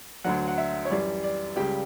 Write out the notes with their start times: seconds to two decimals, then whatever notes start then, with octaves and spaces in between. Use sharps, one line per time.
0.24 D2 D3 F#3 F#5
0.48 F#5
0.58 E5
0.85 C#5
0.90 F#2 E3 G3 D5
1.24 D5
1.56 C#2 C#3 G3 G4